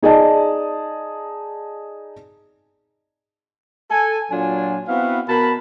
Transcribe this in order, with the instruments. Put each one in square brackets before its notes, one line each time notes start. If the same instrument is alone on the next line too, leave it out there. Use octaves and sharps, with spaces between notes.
[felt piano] D#4 G#4 D5 D#5 A5
[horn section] A4 G#5
A#2 F#3 D4 F4 G#5
B3 C4 E4 F#4 B4 F5
B2 A#4 A5 B5